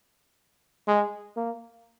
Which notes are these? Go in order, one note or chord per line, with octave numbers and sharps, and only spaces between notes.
G#3
A#3